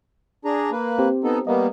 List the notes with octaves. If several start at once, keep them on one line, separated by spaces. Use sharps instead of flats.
D4 G#4 A#5
A#3 B4
C4 G4 C5
B3 D#4 A4
G3 A#3 B3 A#4 D#5